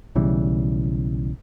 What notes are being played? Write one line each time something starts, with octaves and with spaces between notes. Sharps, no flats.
B1 C#3 E3 G3